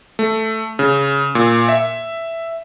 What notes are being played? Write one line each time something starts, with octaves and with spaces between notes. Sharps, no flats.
A3
C#3
A#2
E5